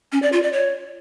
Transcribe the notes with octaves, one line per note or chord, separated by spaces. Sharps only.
C#4
D5
F4
D5
C#5